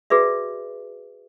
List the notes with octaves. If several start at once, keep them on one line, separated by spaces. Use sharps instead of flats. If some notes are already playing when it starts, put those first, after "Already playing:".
F#4 G#4 B4 D5 E5